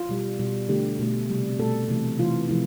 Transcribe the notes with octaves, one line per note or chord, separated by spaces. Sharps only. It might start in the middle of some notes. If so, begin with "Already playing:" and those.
Already playing: F4
B2 G3
B2 G3
D3 A3 G4
B2 A3
C3 G3
B2 A3 A4
C3 E3 A3
C3 E3 A3 F4
C3 F3 A3 E4